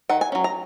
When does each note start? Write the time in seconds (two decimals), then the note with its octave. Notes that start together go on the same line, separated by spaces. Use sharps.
0.09 D#3 F#5
0.21 G#5
0.32 F#3 C#4
0.44 A#5